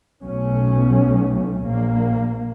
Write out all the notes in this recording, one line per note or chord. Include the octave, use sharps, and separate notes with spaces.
B1 B2 F#3 A3 C#4
A#1 A#3